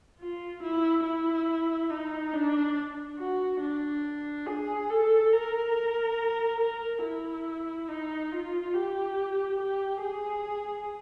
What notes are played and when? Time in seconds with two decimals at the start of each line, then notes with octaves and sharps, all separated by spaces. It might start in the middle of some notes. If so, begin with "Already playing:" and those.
0.20 F4
0.63 E4
1.05 E4
1.91 D#4
2.34 D4
3.19 F#4
3.62 D4
4.47 G#4
4.90 A4
5.32 A#4
6.61 A#4
7.03 E4
7.88 D#4
8.31 F4
8.74 G4
9.60 G4
10.02 G#4